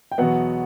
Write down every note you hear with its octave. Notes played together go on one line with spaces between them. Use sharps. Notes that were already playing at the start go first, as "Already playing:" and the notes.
G5
E2 B2 F#3 B3 F#5